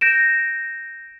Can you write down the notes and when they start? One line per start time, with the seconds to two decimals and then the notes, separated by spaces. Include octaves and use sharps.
0.01 G6 A#6 D7 E7